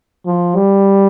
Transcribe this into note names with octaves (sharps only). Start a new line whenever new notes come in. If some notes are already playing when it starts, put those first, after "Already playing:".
F3
G3